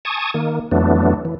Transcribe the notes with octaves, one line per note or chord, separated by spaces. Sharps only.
G#5 A5 C#6 D#6
D#3 A#3
F2 E3 F#3 A3 B3 D4
E3